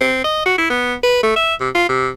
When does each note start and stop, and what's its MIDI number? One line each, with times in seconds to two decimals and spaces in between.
0.01 0.20 60
0.24 0.44 75
0.46 0.55 66
0.58 0.68 64
0.70 0.95 59
1.04 1.21 71
1.23 1.35 57
1.36 1.55 76
1.60 1.69 48
1.75 1.87 65
1.89 2.09 48